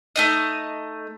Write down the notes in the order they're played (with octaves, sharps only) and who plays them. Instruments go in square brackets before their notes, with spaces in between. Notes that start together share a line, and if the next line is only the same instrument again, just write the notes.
[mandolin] A3 D#4 D#5